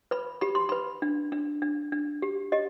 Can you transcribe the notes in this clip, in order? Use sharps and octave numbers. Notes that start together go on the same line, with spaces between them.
B4 B5
G4 B5
C6
B4 B5
D4
D4
D4
D4
G4
G4 D#5